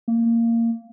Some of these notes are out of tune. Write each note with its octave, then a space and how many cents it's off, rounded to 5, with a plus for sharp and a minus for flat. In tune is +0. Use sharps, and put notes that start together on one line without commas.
A#3 -15